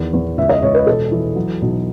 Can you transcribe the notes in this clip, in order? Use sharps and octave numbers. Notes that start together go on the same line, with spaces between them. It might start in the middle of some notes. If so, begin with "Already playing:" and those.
Already playing: E2 D#3
E2
C#2 E5
D#5
C#2 C#5
B4
E1 A4
E3
F#3
B1